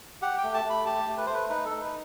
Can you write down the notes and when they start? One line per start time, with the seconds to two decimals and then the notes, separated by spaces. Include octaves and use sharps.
0.22 G4 F#5
0.38 G5
0.43 A3
0.54 A5
0.64 A3
0.70 B5
0.86 G4 A5
1.07 A3
1.18 B4
1.26 A3 C5
1.34 B4
1.49 D#4 B4
1.65 A4
1.70 D#4
1.81 B4